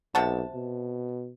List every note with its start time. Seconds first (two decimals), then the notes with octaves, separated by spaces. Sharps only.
0.15 B1 C3 F#5 A5
0.55 B2